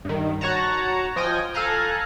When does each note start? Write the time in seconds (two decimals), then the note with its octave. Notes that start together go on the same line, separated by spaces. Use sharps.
0.05 G2 D#3
0.41 F#4 C#5 F#5 A5 A#5
1.16 F3 D#5 G5 G#5 A#6
1.54 A4 F5 G#5 A#5 F#6